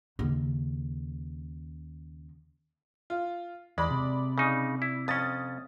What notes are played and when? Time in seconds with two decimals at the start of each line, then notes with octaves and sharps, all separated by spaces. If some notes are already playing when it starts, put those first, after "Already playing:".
0.19 D#2 C#3
3.10 F4
3.78 E2 G#3 D5 B5
3.91 C3
4.38 C#3 D#4
4.82 E4
5.08 F2 C#4 D#6 A6